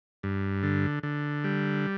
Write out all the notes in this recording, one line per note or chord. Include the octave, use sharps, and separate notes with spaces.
G2
D3
D3
G3